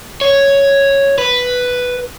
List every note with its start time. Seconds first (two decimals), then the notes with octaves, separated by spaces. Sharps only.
0.21 C#5
1.18 B4